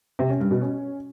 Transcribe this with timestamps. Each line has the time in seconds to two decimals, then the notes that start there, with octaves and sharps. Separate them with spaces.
0.19 C3
0.30 C#4
0.40 G2
0.51 B2
0.61 C#4